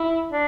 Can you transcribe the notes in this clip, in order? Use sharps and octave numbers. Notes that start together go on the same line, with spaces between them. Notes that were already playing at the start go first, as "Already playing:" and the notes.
Already playing: E4
D4